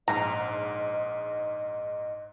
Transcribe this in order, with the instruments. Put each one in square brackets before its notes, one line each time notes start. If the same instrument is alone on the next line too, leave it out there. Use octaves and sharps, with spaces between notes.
[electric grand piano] A#1 G#2 [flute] D#5 [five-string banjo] A#5